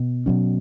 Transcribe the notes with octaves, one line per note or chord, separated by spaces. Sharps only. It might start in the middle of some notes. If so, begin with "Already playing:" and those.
Already playing: B2
B2 F#3 C#4